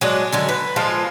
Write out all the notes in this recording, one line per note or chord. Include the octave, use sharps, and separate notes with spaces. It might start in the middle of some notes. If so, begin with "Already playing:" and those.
F#3 G#3 D4
D3 F#3 G#3
B4
F3 G#3 F4 A4